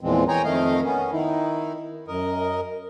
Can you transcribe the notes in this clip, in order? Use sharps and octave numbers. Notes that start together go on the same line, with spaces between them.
E2 A#2 E3 F3 G#3 C4
G#4 C#5 G5 G#5 A#5
F2 D#3 A3 D#5 F5
B3 C#4
D#3 D#4 E4
F#2 A#4 D#5